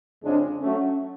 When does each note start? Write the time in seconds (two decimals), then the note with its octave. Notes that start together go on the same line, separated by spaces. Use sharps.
0.24 F2 C#3 G#3 D4
0.61 F#3 A3 C#4